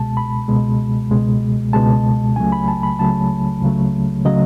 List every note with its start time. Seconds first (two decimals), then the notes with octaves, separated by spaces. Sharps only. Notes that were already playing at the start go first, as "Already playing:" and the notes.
Already playing: C#2 B2 G#3 A5
0.17 B5
0.48 C#2 B2 G#3
1.10 C#2 B2 G#3
1.73 C#2 B2 G#3 A5
2.36 C#2 C#3 F#3 A3 G#5
2.52 B5
2.68 A5
2.83 B5
2.99 C#2 C#3 F#3 A3 A5
3.63 C#2 C#3 F#3 A3
4.25 C#3 F#3 A3 D#5